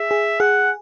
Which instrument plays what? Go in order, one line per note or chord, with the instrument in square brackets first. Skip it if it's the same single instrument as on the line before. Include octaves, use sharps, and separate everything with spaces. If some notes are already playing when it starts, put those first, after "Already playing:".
Already playing: [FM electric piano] G#4 [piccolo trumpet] E5
[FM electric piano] G#4
[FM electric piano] G#4 [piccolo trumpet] F#5